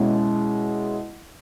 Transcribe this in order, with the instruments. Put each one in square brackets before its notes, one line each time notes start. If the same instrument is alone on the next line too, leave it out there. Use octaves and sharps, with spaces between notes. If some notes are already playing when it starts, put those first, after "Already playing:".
Already playing: [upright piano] B2 G#3 C#4 E4